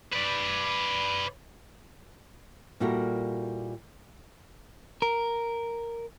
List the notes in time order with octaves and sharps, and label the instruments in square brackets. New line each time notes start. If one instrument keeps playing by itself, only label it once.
[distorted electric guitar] B4 D5
[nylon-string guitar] A#2 G3 E4 F#4 A4 A#4
[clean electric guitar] A#4